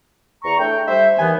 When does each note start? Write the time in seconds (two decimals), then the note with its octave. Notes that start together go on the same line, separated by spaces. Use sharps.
0.43 E2 A#5 C#6
0.59 A3 D4 G5
0.87 G3 C5 E5
1.19 D#2 E3 B3 G#5